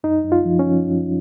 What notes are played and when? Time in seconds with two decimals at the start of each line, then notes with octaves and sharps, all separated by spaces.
0.04 F#2 D#4
0.24 F#2
0.32 F4
0.45 F3
0.59 C#4
0.66 F3
0.87 F#2